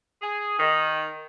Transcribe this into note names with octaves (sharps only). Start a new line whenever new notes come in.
G#4
D#3